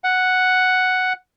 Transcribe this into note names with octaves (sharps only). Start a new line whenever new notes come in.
F#5